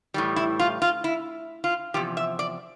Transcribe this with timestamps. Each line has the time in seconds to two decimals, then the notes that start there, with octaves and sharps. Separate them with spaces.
0.14 A2 E3 G3
0.36 E4
0.59 F4
0.82 F4
1.04 E4
1.64 F4
1.94 E2 C3 F3 G4
2.17 E5
2.39 D5